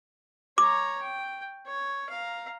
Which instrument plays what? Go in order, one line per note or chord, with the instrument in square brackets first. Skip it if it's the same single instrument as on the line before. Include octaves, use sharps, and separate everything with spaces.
[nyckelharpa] C#5 A#5 [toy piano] D6
[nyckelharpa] G5
C#5
F5 A#5